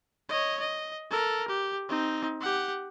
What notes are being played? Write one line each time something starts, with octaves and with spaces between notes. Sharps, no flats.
C#5 D#5
D#5
A4 A#4
G4
C4 D#4
G4 F#5